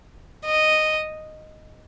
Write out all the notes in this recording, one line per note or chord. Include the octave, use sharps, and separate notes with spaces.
D#5